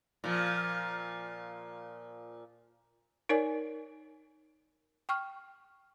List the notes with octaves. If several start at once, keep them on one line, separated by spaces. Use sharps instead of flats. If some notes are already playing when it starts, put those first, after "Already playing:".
A#2 F3
D#4 A#4 C#5 D5 G#5
G5 C#6 F6